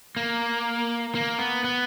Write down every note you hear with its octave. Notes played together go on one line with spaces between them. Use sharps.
A#3
A#3
B3
B3